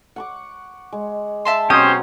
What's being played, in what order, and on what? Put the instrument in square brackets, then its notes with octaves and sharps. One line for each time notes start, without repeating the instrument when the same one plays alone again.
[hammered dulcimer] F#5 C#6 D6
G#3
[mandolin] E5 A5 C6
[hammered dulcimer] B2 F#3 C4 [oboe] C#4 [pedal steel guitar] G4 C5 [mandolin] D#6